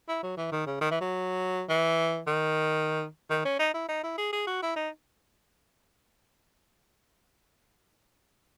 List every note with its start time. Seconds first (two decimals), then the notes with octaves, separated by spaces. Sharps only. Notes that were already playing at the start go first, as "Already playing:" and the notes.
0.08 E4
0.23 F#3
0.37 E3
0.52 D#3
0.67 C#3
0.81 D#3
0.91 E3
1.01 F#3
1.69 E3
2.27 D#3
3.30 D#3
3.45 C#4
3.59 D#4
3.74 E4
3.88 D#4
4.03 E4
4.18 G#4
4.32 G#4
4.47 F#4
4.62 E4
4.76 D#4